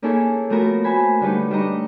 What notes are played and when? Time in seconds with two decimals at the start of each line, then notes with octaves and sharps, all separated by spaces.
0.02 A#3 C#4 D#4 E4 G#4 A4
0.49 F3 A3 B3 F#4 A#4 B4
0.84 F#4 C5 G#5 B5
1.21 D3 G3 A3 D#4 B4
1.51 G3 D4 D#4 D#5 A#5 C#6